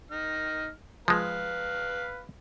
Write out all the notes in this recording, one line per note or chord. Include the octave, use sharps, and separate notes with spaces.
D#4 F6
F3 G#3 B4 F5